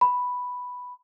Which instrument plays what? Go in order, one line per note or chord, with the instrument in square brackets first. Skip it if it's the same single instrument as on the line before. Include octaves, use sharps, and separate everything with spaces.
[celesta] B5